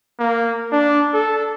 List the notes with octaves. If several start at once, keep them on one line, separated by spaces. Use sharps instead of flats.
A#3
D4
A4